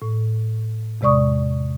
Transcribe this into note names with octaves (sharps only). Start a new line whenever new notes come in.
A2
E2 C3 G#3 D5 C#6 D#6